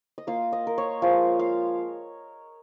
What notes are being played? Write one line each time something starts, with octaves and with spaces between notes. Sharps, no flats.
D#5
A#3 F4 F5
D#5
A#4
C#5
F3 G#3 F4 F5
F5